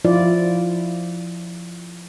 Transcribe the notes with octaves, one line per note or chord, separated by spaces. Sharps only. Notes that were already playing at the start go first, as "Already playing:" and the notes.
F3 E4 F4 D5